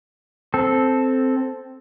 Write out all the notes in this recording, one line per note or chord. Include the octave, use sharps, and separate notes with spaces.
C4 A4